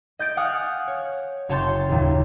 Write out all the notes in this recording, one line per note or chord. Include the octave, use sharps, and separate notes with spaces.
D#5 G6 A6 D7
F5 F#5 G#5 D#6 F6 F#6
C#5
F#1 C#5 A5 C6 G6 A6
D#1 D#2 A#2